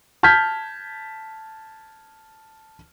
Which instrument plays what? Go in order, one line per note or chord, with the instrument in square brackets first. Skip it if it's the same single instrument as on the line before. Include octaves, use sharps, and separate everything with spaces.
[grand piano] A5 F6 G6 G#6 B6